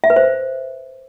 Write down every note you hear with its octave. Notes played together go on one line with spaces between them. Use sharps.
E5
B4
C5